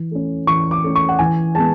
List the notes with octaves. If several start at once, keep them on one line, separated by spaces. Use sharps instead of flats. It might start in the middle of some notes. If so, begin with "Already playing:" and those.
Already playing: E3
A3 C#4
E3 C#6
D6
A3 C#4
C#6
F#5
E3 G#5
G#3 B3 A5